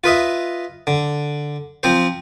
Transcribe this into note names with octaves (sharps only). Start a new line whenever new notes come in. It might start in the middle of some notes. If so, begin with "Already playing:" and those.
F4 B4 D#5 E5
D3
F3 C4 C5